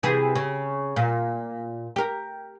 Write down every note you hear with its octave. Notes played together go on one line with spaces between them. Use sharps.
C3 E3 G#4
C#3
A#2
G4 A#4